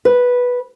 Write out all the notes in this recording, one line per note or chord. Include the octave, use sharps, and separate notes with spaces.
B4